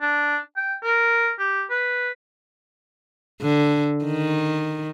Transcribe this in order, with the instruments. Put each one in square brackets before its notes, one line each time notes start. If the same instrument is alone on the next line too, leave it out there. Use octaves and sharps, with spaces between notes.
[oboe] D4
G5
A#4
G4
B4
[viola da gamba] D3
D#3